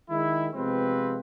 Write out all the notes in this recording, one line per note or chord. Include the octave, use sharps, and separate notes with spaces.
D#3 G#3 E4
C3 F3 G#3 B3 C4 B4